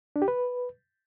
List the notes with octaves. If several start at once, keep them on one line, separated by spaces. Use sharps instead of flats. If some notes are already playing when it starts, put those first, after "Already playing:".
D4
G4
B4